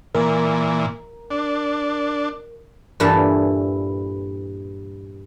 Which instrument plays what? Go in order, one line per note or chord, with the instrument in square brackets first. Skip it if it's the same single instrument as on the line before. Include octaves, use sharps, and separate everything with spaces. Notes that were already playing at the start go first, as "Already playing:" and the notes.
[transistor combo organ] A#2 E3 [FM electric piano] A#4
[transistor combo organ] D4
[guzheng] G2 A#2 E3 E4 A4